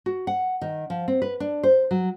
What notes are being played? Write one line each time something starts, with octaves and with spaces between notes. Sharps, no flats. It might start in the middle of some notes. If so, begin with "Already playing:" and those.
F#4
F#5
D#3
F3
C4
B4
D4
C5
F#3